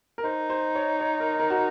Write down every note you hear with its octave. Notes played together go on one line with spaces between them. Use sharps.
A#4
D#4 C5
C5
C#5
C#5
A#4
A#4
F#4